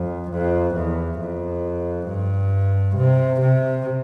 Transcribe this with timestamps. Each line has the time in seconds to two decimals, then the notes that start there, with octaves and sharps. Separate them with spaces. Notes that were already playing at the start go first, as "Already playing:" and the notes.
Already playing: F2
0.31 F2
0.75 E2
1.19 F2
2.07 G2
2.96 C3
3.40 C3